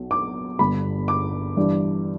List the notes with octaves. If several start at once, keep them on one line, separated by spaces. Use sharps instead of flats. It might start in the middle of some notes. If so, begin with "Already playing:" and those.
Already playing: B1 B2 B3
D6
G1 G2 G3 B3 B5
D6
G2 E3 G3 D4